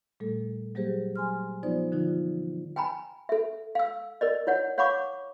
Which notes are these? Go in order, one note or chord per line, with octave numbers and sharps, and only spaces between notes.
A#2 G3 A3 A4
F#3 G3 A#3 G4 G#4 C5
F#3 G#5 C6 F6
F3 B3 D#4 F4 C5 D5
D3 E3 F3 D#4 F4
G5 G#5 A#5 B5
A4 E5
F5 E6
A#4 D5 D#5
E4 C#5 F#5
C#5 F5 F#5 B5 C#6 D6